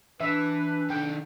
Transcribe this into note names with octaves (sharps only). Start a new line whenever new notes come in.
E3 D4 B4 E5
D#3 A4 G5